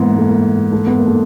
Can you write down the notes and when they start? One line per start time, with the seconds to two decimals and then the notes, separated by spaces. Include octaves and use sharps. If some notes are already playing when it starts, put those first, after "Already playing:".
Already playing: G#2 E3 A#3 B3
0.17 A3
0.28 A#3
0.72 A3
0.86 B3
0.96 A#3
1.07 A3